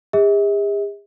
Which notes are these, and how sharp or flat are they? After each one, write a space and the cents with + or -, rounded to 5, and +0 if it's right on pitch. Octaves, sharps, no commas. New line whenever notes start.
G#4 -45 E5 -45